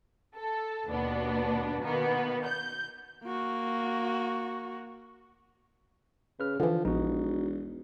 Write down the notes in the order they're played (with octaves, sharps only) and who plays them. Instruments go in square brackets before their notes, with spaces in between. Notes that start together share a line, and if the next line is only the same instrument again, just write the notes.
[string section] A4
D#2 B2 B3 D4
B2 D#3 A#3 B3
G6
[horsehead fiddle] A#3 F#4
[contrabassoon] C#3 [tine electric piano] B4 F6
[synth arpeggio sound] D3 E3 [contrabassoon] F3 [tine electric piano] D4
[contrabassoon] E1 [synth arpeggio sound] A#1 [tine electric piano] D#4 F#4